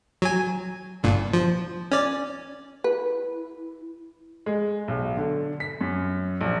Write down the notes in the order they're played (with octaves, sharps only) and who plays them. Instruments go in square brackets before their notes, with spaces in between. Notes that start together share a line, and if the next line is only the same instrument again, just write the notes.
[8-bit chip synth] F#3 G#5
G1 G2 A#2
F3
C#4 D5
[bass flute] E4 [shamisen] B4
[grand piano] G#3
B1
D3
B6
F#2
A#1